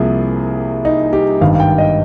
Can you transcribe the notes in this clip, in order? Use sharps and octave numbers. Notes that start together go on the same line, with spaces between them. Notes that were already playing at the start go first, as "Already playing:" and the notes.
Already playing: C2 C3 F3 A#3 G#4
D#4
G4
G#1 G2 D#3 F5
F5
G5
D#5